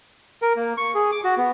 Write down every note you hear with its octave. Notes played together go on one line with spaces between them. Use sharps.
A#4
A#3
C#6
G#4
D6
F#4
B3